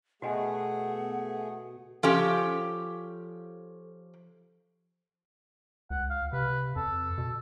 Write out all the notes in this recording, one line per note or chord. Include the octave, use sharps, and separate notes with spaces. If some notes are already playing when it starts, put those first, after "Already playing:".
B2 A3 F#4 G#4 D#5 F#5 G#5
F3 C#4 G4 A4
C#2 F#5
F5
C3 B4
F2 A4
B2